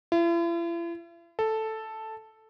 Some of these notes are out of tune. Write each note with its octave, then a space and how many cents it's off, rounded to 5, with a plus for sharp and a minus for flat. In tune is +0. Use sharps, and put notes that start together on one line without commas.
E4 +45
A4 +0